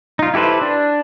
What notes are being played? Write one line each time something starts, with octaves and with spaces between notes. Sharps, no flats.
D#4 F4
E4 G4 A4 B4 C5
D4